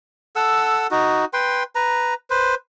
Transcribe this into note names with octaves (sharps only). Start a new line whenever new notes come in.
A4 F#5 E6
D#4 F#4
B4 G5 C6
B4 A#5
B4 C5